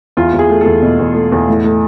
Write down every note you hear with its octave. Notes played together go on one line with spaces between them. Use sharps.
E2 F4
E2
G#4
A3
E2 A4
B2
E2
A3
E2
A2
A3